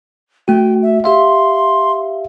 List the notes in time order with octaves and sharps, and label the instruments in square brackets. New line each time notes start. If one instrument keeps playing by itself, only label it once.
[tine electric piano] A3 F#4 [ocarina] G5
[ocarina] E5
[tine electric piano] G4 E5 F5 [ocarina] C6